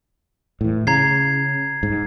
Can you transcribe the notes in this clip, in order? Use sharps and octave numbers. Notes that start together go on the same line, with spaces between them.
A2 E3
C#3 A#5 G#6 C7
G#2